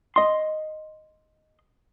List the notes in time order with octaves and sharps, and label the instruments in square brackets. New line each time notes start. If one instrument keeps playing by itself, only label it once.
[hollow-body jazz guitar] D#5 C6